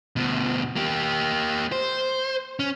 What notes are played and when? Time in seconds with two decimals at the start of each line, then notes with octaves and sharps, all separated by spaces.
0.16 D2 B2
0.76 A#3 G4
1.72 C5
2.59 C#4